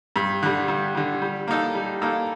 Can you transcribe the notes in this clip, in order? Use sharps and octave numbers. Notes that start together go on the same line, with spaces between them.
G2
D3 G3
G2
D3 G3
G3
A#3 D#4 A4
G3
A#3 D#4 A4